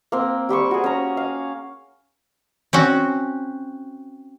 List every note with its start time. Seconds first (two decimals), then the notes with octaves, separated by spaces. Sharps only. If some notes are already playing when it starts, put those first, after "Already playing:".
0.12 A#3 C4
0.49 G3 G4 C5 C#6
0.71 F#4 G#4
0.84 C#4 A#5
1.17 F5
2.73 C4 C#4 F#4